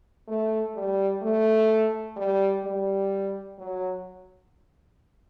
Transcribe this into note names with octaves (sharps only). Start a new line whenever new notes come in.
A3
G3
A3
G3
G3
F#3